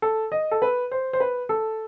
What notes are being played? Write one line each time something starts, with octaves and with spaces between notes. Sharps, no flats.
A4
D#5
A4
B4
C5
C5
B4
A4